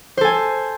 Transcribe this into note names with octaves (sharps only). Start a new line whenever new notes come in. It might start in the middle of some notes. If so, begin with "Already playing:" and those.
A4 C5 G#5